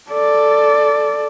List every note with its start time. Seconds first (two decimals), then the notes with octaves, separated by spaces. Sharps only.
0.11 A4 D5